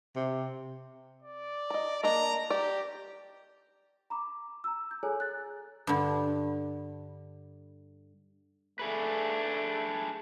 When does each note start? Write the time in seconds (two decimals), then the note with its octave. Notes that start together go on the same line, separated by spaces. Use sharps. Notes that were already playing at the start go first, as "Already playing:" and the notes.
0.16 C3
1.23 D5
1.70 D#5 A#5
2.03 A#3 D4 D#5 A#5
2.50 G4 D5
4.10 A#5 B5 D6
4.64 A#5 E6
4.91 G6
5.03 G#4 A4 C#5 G#5 A#5
5.20 F#6 A6
5.87 G2 D3
8.79 A3 D4 G#4 B4